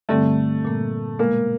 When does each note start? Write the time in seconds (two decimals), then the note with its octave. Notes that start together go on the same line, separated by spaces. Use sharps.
0.09 G2 D3 G3 A3 C4
0.65 A#2 G3 A#3
1.19 B2 G#3 A#3 B3